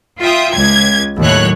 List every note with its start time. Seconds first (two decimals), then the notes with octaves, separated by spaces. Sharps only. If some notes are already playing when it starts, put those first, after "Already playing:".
0.21 F4 E5 G5 D#6
0.53 C#2 G#6
1.21 D#2 A2 F#3 C#5 F#6